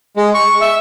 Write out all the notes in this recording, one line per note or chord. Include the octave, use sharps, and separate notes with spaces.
G#3
C#6
E5